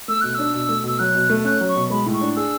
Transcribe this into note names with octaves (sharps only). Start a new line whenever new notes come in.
A3 E6
B2 F#6
D4 E6
B2
A3
B2 E6
F#3 F#6
B2
A3
C#4 F#6
F#3
C#6
B2
G#3 B5
A2
C#6
D4
G#4 E6